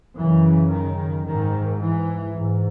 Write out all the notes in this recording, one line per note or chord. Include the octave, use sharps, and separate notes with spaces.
F#2 C#3 E3
D#3
G#2 D#3
E3
G#2